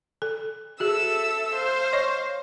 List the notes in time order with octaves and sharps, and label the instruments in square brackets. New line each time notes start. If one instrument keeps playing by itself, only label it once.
[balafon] A4
[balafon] F#4 G#4 [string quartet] A4 E5 E6
[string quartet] C5 F5
[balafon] C#5 D#5 C#6